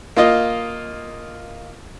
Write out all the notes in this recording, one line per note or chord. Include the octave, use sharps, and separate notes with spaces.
A#3 F4 D#5